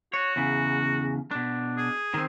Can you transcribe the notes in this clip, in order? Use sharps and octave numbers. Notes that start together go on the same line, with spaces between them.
F#4 C#5
E2 C#3
B2 D4
G#4
D#3 C4